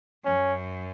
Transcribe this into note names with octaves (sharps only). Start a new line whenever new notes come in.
F#2 C#4